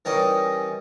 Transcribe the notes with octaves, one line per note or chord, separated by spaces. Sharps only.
E3 G3 C#4 D#4 A#4 D#5